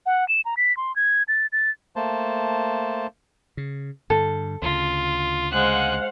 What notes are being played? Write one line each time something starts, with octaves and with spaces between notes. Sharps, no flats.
F#5
E7
A#5
B6
C6
G#6
A6
A6
A3 A#3 C5 A5
C#3
G2 D3 A4
D2 C#3 F4
G#3 C5 F5 F#5 F#6